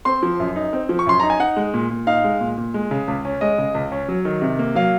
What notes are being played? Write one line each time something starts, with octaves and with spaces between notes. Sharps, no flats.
C4 C6
F3
F#2
D#4
C4
F3
C#6
F#2 C6
D#4 A#5
G#5
D#4 F#5
G#3
A#2
A#2
D#4 F5
G#3
A#2
A#2
G#3
C#3
C#2
C#4
G#3 D#5
C#3
C#2
C#4
F#3
D#3
C3
A#3
F#3 F5